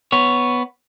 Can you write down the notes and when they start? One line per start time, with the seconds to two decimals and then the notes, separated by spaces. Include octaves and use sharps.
0.12 B3 C#5